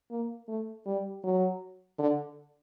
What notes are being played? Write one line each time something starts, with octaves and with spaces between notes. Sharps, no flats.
A#3
A3
G3
F#3
D3